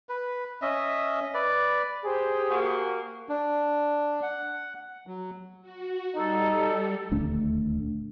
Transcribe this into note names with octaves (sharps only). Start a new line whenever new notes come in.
B4
C#4 D#5 E5
B4 D5
G4 G#4 C5
A#3 F#4
D4
F#5
F#3
F#4
G3 D#4 A4
D#1 D2 A3 D4